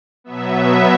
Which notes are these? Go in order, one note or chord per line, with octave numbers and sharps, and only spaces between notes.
B2 F#3 B3 E5